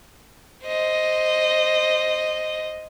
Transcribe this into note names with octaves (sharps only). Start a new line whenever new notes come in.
C5 D#5